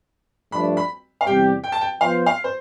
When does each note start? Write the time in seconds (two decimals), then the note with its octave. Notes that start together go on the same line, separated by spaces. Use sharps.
0.52 G2 F3 A3 D4 B5
0.77 B5
1.21 F5
1.26 E2 C3 G3 C4 G4 G5
1.64 G5
1.72 A5
1.81 G5
2.01 F3 B3 F4 C5 F5
2.26 F5
2.44 C5